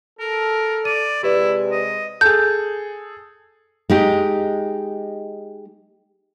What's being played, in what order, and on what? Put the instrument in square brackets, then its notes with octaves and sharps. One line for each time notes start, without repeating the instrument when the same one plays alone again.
[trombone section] A4 [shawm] A#4
[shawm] D5 [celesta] D#7
[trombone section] C3 G#3 [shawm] E4 [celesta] G4 B4 D5
[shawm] D#5
[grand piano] G#4 A4 [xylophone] G6
[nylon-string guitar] G#3 D#4 G4